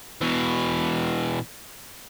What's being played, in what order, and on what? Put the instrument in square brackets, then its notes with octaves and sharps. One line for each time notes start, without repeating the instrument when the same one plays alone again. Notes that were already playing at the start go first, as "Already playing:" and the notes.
[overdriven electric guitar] B2 E3